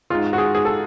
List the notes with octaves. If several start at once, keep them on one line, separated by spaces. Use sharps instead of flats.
G#2 G#3 F4
F#4
G#4
G#4
A4